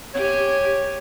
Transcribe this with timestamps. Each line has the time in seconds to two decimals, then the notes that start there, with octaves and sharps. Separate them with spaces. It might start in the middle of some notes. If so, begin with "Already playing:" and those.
0.14 G4 C#5 G#5